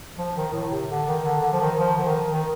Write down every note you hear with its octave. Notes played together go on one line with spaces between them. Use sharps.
F3
D#3
A2
C3
D3
D#3
D3
D3
F3
D#3
F3
D3
D#3
D#3